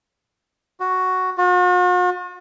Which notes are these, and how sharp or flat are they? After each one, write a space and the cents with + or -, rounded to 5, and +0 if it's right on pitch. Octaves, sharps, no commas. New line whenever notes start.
F#4 +5
F#4 -45